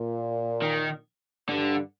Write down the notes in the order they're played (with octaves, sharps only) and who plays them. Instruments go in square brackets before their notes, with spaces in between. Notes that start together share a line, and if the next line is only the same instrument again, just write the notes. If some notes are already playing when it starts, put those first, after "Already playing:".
Already playing: [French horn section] A#2
[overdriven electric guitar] D#3
[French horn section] G2 [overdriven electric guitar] D3